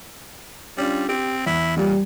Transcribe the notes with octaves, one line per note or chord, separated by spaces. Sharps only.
G3 C#4 D4 F4
C4 G4
E2 E4
A#2 G3